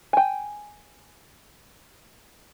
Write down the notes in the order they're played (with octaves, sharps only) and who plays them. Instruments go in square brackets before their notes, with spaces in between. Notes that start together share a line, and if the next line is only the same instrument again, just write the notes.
[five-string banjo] G5 G#5